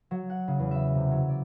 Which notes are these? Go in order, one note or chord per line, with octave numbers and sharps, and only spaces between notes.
F#3
F#5
C#3
E2
E5
C3
F#3
D5